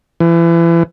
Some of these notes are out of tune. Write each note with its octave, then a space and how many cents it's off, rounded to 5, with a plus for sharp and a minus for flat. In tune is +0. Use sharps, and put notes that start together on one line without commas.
E3 +30